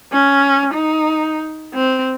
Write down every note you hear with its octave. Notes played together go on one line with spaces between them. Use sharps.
C#4
D#4
C4